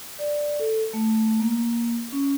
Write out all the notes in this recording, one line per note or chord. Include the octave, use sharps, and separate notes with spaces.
D5
A4
A3
A#3
C#4